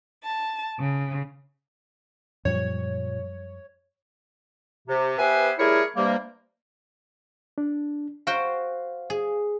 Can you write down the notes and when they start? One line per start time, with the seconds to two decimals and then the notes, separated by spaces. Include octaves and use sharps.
0.23 A5
0.79 C#3
2.45 F#2 A#2 F3 G3 C#5
4.88 C3
5.18 B3 G4 B4 C5 E5 G#5
5.59 G3 A3 E4 G#4 A#4 C#5
5.96 G2 C3 G3 A#3
7.58 D4
8.27 F#4 C5 F5 G5
9.10 G#4